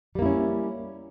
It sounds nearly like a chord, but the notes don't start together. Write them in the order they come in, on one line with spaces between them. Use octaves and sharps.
G3 A#3 E4 C#4